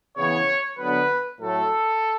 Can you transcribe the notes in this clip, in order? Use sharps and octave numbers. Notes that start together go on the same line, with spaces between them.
C#3 E3 B3 C#5
D3 F#3 B3 B4
A2 F#3 A3 A4